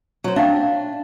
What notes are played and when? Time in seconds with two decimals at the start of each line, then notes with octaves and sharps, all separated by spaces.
0.24 F#3 C5
0.36 D4 E5 F5 G5